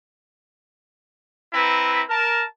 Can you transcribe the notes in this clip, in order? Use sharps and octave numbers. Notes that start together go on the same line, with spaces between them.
C4 E4 B4 A#5
A#4 A5